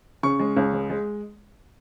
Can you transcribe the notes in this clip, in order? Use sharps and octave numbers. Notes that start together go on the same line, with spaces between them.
C#3 C#6
G#3
C#2
G#3
G#3